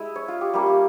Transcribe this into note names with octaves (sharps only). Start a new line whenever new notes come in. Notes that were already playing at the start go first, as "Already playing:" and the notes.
Already playing: G#3 E4 E5
C#5
F4
G4
G3 A#3 C#4 G4
G4